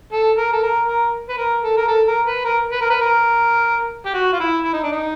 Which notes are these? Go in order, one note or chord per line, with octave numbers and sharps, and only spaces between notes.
A4
A#4
A4
A#4
A#4
B4
A#4
A4
A#4
A4
A#4
B4
A#4
B4
A#4
B4
A#4
G4
F#4
F4
E4
E4
D#4
D4
D#4